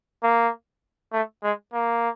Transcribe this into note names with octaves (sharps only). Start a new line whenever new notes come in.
A#3
A3
G#3
A#3